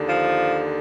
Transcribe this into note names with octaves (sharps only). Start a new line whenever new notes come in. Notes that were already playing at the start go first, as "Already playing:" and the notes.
Already playing: D#2 D3
F3